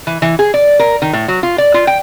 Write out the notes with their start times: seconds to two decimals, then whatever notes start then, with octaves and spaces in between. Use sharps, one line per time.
0.07 E3
0.22 E3
0.39 G#4
0.54 D5
0.79 A#4
1.02 D#3
1.13 A2
1.28 F#3
1.43 F4
1.58 D5
1.74 F4
1.87 G5